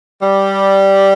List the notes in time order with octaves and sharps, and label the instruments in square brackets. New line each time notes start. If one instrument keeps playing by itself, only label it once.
[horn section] G3